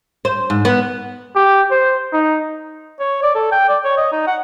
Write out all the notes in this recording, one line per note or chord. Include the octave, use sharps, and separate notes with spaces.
C5
G#2
B3
G4
C5
D#4
C#5
D5
A4
G5
D5
C#5
D#5
D#4
F#5